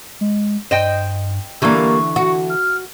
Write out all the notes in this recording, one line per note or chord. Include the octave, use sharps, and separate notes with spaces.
G#3
G2 C5 D#5 G5
D3 E3 G3 A#3 C#6
F#4
F6